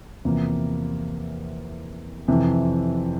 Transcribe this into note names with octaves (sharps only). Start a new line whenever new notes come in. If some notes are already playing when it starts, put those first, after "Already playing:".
E2 C3 F3 A#3
F2 C3 E3